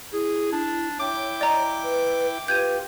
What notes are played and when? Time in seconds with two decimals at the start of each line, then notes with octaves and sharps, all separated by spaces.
0.13 E4 G#4
0.52 D4
1.00 E4 C#5 G5 D6
1.41 D5 D#5 A#5
1.84 B4
2.48 F4 G4 B4 G6 G#6 D#7